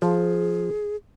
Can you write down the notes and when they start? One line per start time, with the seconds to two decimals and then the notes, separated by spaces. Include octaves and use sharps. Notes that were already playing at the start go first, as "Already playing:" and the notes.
0.02 F3 G#4